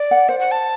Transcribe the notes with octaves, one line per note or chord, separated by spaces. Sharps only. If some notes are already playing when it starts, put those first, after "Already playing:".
Already playing: D5
F#5
C5 F#5
F#5
A5